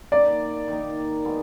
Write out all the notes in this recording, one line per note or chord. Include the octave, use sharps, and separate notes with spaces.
D#3 A#3 D#4 D5
D#3 A#3 D#4
B2 G#3 B3